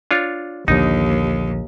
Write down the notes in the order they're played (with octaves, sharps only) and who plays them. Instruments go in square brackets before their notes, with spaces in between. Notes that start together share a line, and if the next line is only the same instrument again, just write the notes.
[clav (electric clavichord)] D4 F4 C#5
[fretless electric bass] A#1 D3 F3 [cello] D#2 [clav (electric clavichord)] D#4